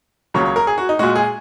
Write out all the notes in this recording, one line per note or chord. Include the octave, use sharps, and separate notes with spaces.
C#2 C#3 F#3 A#3 C#5
C#5
A#4
G#4
F#4
D#4
A#2 G#3 F#4
G#4